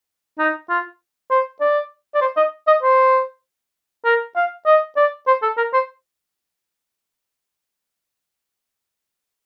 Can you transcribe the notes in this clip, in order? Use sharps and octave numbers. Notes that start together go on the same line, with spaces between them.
D#4
F4
C5
D5
D5
C5
D#5
D#5
C5
A#4
F5
D#5
D5
C5
A4
A#4
C5